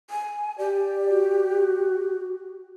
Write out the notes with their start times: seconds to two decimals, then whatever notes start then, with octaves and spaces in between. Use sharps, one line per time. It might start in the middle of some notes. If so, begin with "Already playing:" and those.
0.10 G#5
0.58 G4 D5
1.10 F#4